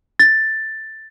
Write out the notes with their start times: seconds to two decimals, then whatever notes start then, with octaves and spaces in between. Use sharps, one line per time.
0.19 A6